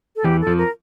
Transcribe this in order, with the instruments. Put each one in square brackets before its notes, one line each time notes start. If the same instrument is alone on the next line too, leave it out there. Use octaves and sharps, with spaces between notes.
[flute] A4
[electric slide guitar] E2 E3 [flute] G4
[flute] A4
[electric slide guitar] F2 F3
[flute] A#4